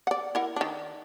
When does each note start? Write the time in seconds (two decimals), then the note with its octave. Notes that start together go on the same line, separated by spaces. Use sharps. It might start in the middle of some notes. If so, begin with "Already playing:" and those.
0.07 D5 F#5
0.35 E4 A#4 F#5
0.56 D#3 D4